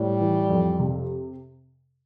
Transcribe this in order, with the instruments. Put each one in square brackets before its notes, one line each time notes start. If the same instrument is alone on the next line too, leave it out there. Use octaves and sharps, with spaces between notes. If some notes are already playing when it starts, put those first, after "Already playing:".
Already playing: [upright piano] A2 [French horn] G3
[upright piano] E3
F2
C3